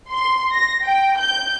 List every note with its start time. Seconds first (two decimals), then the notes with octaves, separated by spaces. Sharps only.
0.11 C6
0.52 A#6
0.84 G5
1.19 G6